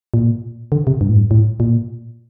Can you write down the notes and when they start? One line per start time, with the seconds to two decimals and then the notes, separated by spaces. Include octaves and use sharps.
0.14 A#2
0.72 D3
0.87 C3
1.01 G2
1.09 A2
1.17 G2
1.31 A2
1.60 A#2